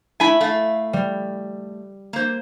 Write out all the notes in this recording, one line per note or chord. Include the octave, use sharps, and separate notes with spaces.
A3 E4 G#5 B5
A3 F5
G3
A#3 C5